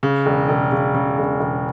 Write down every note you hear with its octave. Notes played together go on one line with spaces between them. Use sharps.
C#3
E1
E1
C#3
C#3
E1
E1